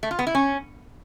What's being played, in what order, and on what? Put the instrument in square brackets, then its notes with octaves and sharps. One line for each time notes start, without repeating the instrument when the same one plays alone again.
[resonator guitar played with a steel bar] A3
F4
B3
E4
C#4